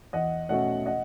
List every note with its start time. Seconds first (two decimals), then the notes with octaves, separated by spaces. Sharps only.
0.13 E2 D#5 F#5
0.49 B2 A3 C#4 D#5 F#5
0.86 D#5 F#5